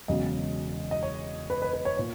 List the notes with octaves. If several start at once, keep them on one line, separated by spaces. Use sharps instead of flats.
E1 E2 C#3 F#3 C#4 D#5
D#5
C#5
B4
B4
B4
C#5
A#2 C#5